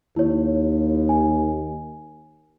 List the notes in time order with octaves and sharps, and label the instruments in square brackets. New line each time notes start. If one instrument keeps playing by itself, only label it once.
[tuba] D#2 [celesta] E4 C#5
[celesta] G#5